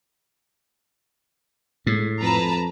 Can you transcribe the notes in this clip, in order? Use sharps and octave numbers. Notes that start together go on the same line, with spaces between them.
A2 G#3
F2 B4 A5 A#5